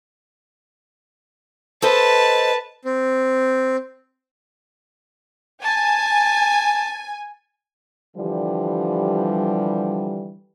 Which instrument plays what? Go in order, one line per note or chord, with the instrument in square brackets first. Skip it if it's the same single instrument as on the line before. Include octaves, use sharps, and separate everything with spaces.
[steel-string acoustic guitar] A4 C5 D#5 [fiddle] B4 A5
[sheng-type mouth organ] C4
[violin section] G#5 [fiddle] A5
[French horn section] D3 E3 F3 G3